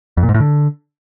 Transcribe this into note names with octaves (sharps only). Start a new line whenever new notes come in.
F2
A#2
G#2
A2
D3